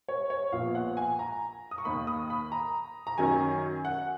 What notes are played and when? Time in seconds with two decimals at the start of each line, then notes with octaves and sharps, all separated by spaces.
0.09 C#5
0.30 C#5
0.52 A#1 A#2 F3 B3 F5
0.75 F#5
0.97 G#5
1.19 A#5
1.71 D#6
1.78 C#6
1.85 D#2 D#3 A#3 B5
2.07 D#6
2.30 B5
2.52 A#5
3.07 A#5
3.18 F#2 D#3 F#3 C#4 G#5
3.85 F#5